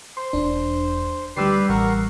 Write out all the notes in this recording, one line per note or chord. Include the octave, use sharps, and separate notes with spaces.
C5 C6
E1 D4
D2 G3 G4 B4 D5 E6 C7
A1 A#4 F#5 C#6